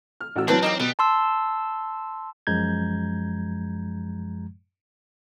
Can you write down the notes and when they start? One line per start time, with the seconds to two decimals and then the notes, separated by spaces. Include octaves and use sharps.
0.21 F6
0.36 A1 F#4 E6
0.48 E3 F#3 C4 D4 B4 A5
0.63 G3 A#3 C4 D#4
0.80 B2 G3 B3
0.99 A5 C6 E6
2.47 F#2 F3 G#3 A#5 G6 G#6